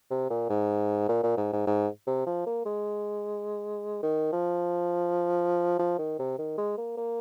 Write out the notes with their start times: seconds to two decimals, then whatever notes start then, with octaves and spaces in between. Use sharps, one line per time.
0.11 C3
0.30 A#2
0.50 G#2
1.09 A#2
1.23 A#2
1.37 G#2
1.53 G#2
1.67 G#2
2.07 C3
2.27 F3
2.46 A#3
2.66 G#3
4.03 D#3
4.33 F3
5.79 F3
5.99 D#3
6.19 C3
6.38 D#3
6.58 G#3
6.78 A#3
6.97 A#3